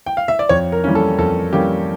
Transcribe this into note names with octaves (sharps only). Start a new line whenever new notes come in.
G5
F5
E5
D5
F2 C#5
A#4
E3 G3 A#3 C#4
A4
F2 A4
E3 G3 A#3 C#4 G4